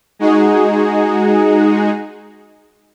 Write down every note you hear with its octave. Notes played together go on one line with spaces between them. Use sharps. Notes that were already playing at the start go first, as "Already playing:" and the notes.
G#3 D#4 F#4 G#4